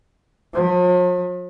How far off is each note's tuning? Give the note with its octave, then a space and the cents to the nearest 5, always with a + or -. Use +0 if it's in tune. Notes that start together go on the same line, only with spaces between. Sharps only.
F3 +45